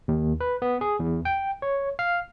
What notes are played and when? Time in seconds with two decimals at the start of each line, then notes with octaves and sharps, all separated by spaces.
0.08 D#2
0.41 B4
0.62 B3
0.81 G#4
1.00 E2
1.25 G5
1.62 C#5
1.99 F5